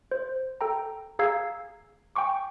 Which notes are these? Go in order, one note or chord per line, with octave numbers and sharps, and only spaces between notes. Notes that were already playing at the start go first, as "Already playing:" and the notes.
C5
A4 G5 A#5
G#4 F5 A#5 E6 G#6 C7
G5 G#5 C#6 D6